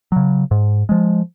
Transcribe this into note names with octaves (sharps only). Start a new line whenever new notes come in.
C#3 F#3
G#2
F3 G#3